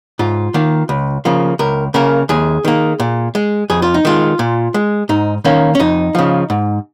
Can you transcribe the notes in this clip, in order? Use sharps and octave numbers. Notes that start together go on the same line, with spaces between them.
G#2 F4
D#3 A#3
C#2
C#3 F3 A#3
C#2 A#4
C#3 A#3 A#4
D#2 G#4
D#3 A#3
A#2
G#3
F2 G#4
F4
D#4
D#3 G#3 F4
A#2
G#3
G#2 D#4
D#3 A#3 C#4
C#4
F2 D#4
C#3 F3
G#2